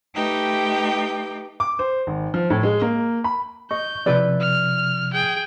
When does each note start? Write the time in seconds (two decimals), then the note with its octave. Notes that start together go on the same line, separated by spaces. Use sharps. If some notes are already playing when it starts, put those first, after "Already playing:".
0.15 A3 D#4 G4 B4 G5
1.60 D6
1.79 C5
2.07 G#1
2.34 F3
2.50 A2
2.63 G#3
2.82 A#3
3.24 B5
3.71 D#5 C#6 G6
4.06 C3 F3 E4 B4 D5
4.40 F6
5.13 G#4 G5